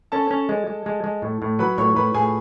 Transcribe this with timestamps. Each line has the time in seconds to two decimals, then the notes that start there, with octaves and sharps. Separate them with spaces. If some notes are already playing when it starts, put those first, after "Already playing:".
0.12 C#4 A4 A5
0.31 C#4
0.49 G#3
0.67 G#3
0.86 G#3
1.04 G#3
1.22 A2
1.42 A2
1.59 F#3 B4 B5
1.78 A2 C#5 C#6
1.96 A2 B4 B5
2.14 A2 G#4 G#5